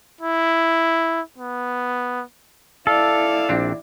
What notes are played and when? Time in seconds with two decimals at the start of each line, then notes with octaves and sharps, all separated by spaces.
0.21 E4
1.38 B3
2.87 E4 A4 D5 F5
3.49 A#1 C4 D4